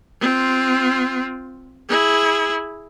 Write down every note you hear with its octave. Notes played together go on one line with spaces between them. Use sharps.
C4 F4
E4 G#4